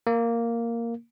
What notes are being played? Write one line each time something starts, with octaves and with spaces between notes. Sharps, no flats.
A#3